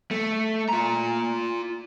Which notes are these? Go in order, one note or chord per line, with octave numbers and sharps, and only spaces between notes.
A3
F4 A#5